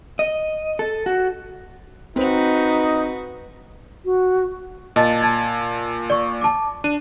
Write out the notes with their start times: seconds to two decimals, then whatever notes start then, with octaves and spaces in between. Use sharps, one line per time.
0.19 D#5
0.79 A4
1.06 F#4
2.16 C4 D#4 F#4 B4
4.05 F#4
4.96 A#2 D#5 A5 A6
5.20 A5 G#6 A6
6.10 D5 C#6
6.41 A5 D6
6.84 D4 D#7